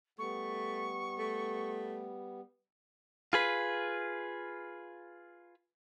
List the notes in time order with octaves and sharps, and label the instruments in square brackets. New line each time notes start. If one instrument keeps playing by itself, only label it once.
[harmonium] G3 B3 [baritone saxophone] A3 [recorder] C#6
[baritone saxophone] A3
[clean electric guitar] F4 G#4 B4